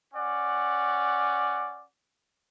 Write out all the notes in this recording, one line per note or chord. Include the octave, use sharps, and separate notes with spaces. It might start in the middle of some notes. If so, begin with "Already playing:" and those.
C#4 D5 F#5